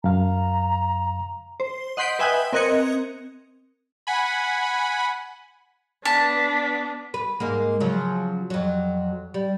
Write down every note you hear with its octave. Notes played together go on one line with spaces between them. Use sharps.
F#2 F5 A#5
C5
D#5 F#5 C6 G6 B6 D7
B4 E5 G5 G#5 D#6 F#6
C4 A#4 D#5 F#6 G#6 C#7
F#5 G#5 B5
B3 D4 A5 B6
B4
G#2 G#3 A#3
C#3 F3 F#3
F2 F#3
G3